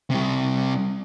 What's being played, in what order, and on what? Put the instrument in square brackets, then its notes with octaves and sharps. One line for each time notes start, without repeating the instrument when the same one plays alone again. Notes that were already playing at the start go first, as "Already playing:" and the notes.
[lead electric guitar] C3 G3